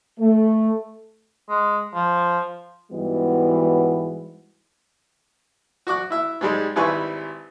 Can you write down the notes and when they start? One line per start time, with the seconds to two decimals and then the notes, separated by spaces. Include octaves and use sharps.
0.19 A3
1.50 G#3
1.95 F3
2.92 G#2 E3 G3 G#3 B3 F#4
5.87 F#4 C#6 D6 F#6
6.10 E4 E5
6.41 G#2 G3 G#3
6.76 G#1 G3 E4 B4 G#5 C#6